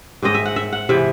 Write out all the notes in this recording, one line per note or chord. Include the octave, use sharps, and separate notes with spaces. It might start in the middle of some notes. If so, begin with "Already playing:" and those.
G#2 D#3 G#3 C4 D#5
E5
F#5
E5
F#5
C3 E3 G#3 E5